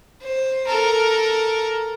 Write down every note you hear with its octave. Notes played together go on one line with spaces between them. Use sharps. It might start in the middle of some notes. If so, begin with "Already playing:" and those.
C5
A4 A#4